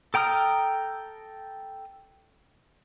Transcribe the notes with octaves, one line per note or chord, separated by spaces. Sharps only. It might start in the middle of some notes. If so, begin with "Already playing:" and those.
A4 G5 A#5 D#6 F6